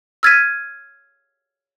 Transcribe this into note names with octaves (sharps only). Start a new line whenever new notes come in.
E6 F6 G#6 A6 B6 D#7